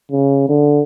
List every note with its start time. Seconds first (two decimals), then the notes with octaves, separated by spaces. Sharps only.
0.12 C#3
0.49 D3